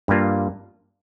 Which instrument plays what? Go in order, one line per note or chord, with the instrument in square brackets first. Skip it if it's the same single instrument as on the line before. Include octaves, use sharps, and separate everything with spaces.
[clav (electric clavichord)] G2 G3 A#3 F4